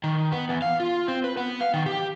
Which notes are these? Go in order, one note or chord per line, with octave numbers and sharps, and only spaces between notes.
D#3
B3
E2
F5
F4
C4
B4
B3
F5
D#3
G4